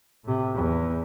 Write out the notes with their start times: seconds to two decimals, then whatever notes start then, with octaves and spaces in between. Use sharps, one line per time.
0.24 A2 C3
0.55 E2